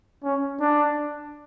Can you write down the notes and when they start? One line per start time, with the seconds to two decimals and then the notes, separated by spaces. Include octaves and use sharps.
0.23 C#4
0.60 D4